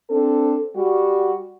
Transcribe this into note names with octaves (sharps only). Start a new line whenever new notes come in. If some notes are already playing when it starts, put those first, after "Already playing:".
C4 D4 A4
G3 F#4